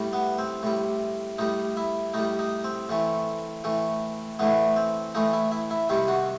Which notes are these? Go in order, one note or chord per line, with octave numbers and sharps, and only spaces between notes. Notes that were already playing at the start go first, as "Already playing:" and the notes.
Already playing: A2 G3
B3
C4
A2 G3
A2 G3 D#4
E4
A2 G3 D#4
D#4
C4
A2 E3 A3
A2 E3 A3
A2 E3 A3 B3
C4
A2 E3 A3 D#4
E4
E4
E4
C3 D#3 G3 E4
F#4